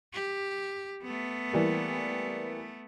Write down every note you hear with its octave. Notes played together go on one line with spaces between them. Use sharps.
G4
A3 B3
E3 G3 A#3